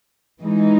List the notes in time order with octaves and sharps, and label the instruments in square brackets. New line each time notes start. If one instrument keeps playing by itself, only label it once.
[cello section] E3 G#3 D#4